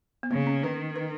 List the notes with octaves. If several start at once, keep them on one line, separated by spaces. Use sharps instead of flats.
B3
C#3 A#3
C#4
D#3 B4
B4